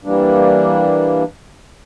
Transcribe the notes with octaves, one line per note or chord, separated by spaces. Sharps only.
E3 G3 A#3 D4